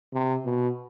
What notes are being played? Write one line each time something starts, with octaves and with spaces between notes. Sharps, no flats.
C3
B2